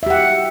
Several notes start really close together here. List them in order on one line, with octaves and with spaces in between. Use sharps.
E5 G4 F#5